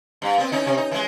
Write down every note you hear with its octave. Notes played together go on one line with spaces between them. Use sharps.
G2
B3 C4
C#4 D#4 E4
C3 C#4
D#4
E3 G#3